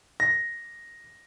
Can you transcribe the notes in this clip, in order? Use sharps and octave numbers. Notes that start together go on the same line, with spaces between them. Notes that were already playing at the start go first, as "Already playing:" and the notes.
A#6